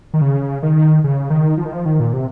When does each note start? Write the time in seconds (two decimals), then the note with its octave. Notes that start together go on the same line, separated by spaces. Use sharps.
0.14 D#3
0.22 C#3
0.63 D#3
1.04 C#3
1.30 D#3
1.57 F3
1.65 D#3
1.73 F3
1.85 D#3
2.00 A#2
2.13 C3